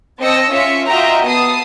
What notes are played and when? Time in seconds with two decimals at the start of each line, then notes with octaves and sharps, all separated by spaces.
0.20 C4 D#5 A5 E6 A#6 C#7
0.52 C#4 F4 E5 B6 C#7
0.87 F4 F#4 D#5 E5 G5 A#5
1.25 B3 A5 D#6 C7